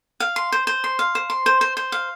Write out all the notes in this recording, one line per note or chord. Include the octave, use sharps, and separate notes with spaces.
F5
C6
C5
C5
C6
F5
C5
C6
C5
C5
C5
F5